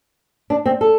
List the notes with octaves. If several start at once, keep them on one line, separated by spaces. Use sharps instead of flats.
D4
C4
A4